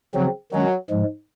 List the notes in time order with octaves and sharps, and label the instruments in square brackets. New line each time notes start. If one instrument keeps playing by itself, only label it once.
[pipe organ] C#3 F3 C4 [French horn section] F#3
[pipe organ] D#3 G#3 C#4 [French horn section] F#3
[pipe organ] G#2 F3 G#3